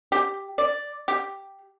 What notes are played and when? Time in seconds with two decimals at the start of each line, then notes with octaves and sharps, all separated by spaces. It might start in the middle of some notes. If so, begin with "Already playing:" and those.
0.12 G4
0.58 D5
1.08 G4